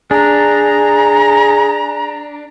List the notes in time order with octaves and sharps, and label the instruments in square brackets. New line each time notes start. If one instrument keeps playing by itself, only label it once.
[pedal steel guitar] D4 [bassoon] G#4 [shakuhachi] A#5